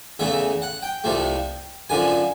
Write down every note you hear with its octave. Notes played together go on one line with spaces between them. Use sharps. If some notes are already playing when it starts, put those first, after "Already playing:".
E2 C#3 E3 A3 E5
F#5
G5
C2 C3 F3 A3
F#2 D3 F3 G#5